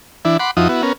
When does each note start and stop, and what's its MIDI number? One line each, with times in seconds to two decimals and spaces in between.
0.25 0.37 52
0.25 0.37 62
0.25 0.37 64
0.40 0.51 78
0.40 0.51 83
0.40 0.51 84
0.40 0.51 86
0.57 0.68 41
0.57 0.68 53
0.57 0.68 63
0.57 0.68 64
0.57 0.68 66
0.57 0.68 87
0.69 0.82 59
0.69 0.82 64
0.69 0.82 66
0.83 0.93 59
0.83 0.93 61
0.83 0.93 70